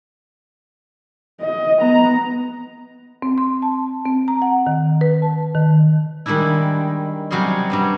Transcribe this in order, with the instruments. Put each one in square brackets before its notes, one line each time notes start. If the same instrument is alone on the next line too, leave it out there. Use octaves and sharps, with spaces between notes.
[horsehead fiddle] D#5
B3 A#5
[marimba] C4
C6
A5
C4
A#5
F#5
D#3
B4
A5
D#3
[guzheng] D#3 G3 G#3 D4 E4
C3 F#3 G3 C#4 G#4 C6
G2 F#3 G3